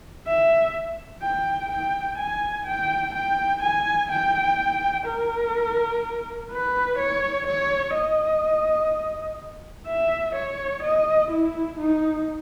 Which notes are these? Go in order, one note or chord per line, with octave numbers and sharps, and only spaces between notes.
E5
G5
G5
G#5
G5
G5
G#5
G5
A#4
B4
C#5
C#5
D#5
E5
C#5
D#5
E4
D#4